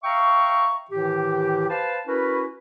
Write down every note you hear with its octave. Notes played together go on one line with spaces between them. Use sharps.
E5 F5 G5 A#5 C#6
A2 D#3 E3 G4
B4 C5 F5 A5
C#4 E4 F#4 A#4 B4